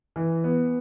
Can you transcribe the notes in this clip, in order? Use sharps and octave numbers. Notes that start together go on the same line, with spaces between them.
E3
B3